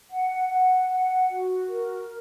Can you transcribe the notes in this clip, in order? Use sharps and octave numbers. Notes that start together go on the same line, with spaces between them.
F#5
F#5
F#5
F#4
A#4